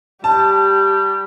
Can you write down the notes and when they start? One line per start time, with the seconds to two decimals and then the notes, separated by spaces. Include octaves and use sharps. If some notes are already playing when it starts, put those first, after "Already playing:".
0.24 G3 G4 A5